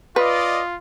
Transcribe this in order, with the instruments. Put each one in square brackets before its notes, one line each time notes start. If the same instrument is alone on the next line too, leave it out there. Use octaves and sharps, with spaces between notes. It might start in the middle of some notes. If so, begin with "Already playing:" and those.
[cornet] F4 [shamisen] B4 [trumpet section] D5 D#5